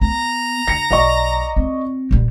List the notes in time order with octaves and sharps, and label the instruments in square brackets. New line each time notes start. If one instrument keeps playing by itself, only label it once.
[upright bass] B3 [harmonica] A#5
[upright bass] D3 [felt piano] A#6 C#7
[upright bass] B1 [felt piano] D5 D#5 C#6
[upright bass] C4
D#1 G3